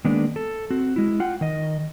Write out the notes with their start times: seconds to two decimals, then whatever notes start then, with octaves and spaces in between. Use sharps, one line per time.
0.05 D#3 G#3 A#3 B3 D4
0.36 A4
0.70 C4 F#4
0.96 G#3 E4
1.20 F4 F#5 G5
1.41 D#3 D#5